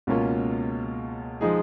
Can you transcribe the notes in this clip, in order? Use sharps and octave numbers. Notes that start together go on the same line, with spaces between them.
C#2 B2 A#3 C#4 F4
F3 G#3 D#4 G#4